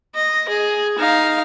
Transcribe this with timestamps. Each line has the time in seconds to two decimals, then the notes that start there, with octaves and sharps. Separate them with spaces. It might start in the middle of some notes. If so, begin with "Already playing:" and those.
0.15 D#5
0.49 G#4
0.99 D#4 F5